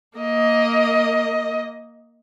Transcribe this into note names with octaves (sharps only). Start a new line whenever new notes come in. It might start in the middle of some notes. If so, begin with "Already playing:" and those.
A#3 D#5